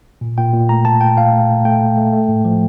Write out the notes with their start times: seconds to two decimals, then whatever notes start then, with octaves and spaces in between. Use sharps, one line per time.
0.21 A#2
0.38 A#2 G5
0.53 A#2
0.69 A3 A#5
0.85 A#2 A5
1.01 A#2 G5
1.17 A#2 F5
1.33 A3
1.49 A#2
1.65 A3 G5
1.81 A#2
1.97 A3
2.13 A3
2.29 A2
2.45 F3